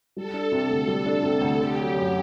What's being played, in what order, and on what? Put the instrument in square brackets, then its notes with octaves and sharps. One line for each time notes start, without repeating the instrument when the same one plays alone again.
[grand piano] G3 [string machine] A4
[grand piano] D4
C3
D2
G3
D4
C3
D2
[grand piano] D3 [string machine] G4
[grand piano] F#3
F#2